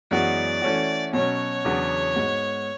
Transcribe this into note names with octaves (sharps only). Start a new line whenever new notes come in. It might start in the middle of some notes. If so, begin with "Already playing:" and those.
F#2 E3 G#3 B3 F#4 D5
E3 A3 C#4 F#4
B2 F#3 C#4 C#5
E2 C#3 F#3 B3 D4
G#2 G#3 B3 F#4